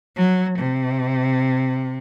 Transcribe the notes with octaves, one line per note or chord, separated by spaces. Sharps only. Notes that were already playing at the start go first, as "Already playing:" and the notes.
F#3
C3